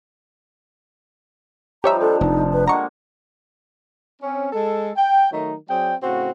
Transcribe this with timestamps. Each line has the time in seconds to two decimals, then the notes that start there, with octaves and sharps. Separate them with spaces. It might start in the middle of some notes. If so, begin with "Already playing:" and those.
1.84 F3 G3 D#4 G4 C#5 E5 A#5
2.00 C3 F3 D4 A4
2.21 F1 D#4
2.53 B4
2.68 D3 G#3 A#3 F#5 A#5 C#6
4.22 C4 C#4
4.53 G#3 A4
4.96 G5
5.31 D#3 F#3 A3 D#4
5.69 F#3 C4 G#4 D5 G5
6.03 A2 C#3 C4 F#4